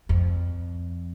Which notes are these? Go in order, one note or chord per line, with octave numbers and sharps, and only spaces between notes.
F2